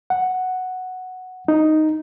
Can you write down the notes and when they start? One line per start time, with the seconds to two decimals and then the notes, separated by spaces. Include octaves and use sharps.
0.10 F#5
1.48 D#4